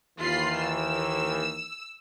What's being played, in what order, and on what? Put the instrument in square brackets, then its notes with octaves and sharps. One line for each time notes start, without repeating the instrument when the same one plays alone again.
[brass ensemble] D#2 D#3 E3 [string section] F4 B5 C7
[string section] E6